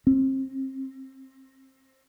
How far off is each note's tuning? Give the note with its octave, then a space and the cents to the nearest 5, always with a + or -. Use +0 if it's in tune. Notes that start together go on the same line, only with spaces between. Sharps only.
C4 +30